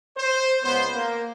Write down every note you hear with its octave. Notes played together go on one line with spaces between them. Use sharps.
C5
C#2 B3 C5
A#3